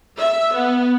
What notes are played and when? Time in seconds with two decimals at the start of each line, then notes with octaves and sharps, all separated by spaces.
0.20 E5
0.54 B3